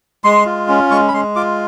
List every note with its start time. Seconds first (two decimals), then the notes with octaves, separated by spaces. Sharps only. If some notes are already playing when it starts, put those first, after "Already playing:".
0.24 G#3 C6
0.46 F4
0.68 C#4
0.91 G#3 C#6
1.08 B5
1.14 G#3 C6
1.36 F4 D6